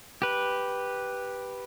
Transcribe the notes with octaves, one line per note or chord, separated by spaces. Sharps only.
G4 B4